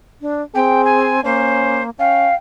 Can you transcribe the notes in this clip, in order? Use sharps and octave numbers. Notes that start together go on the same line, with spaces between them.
D4
C4 G#4 G5
G#5
A#3 C#4 C5
C#4 F5 G5